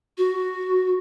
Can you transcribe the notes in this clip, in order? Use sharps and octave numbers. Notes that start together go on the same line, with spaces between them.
F#4